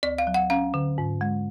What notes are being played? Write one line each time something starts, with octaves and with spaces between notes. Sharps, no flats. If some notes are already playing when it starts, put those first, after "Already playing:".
D2 D5
F5
F#3
F#5
C#4 F5
D3
G#2
G#3